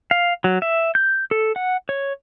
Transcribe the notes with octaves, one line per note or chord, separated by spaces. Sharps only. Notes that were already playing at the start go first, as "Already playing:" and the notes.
F5
F#3
E5
G6
A4
F#5
C#5